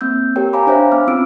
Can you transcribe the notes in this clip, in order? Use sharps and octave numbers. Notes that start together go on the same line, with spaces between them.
A#3 C4 E6 G6
G4 A#4 C#5 G5
C#5 F5 G#5 A#5 B5 D6
D4 C5 C#5 E5 F5
B3 D6 F6
C4 C#4 F4 E6 D7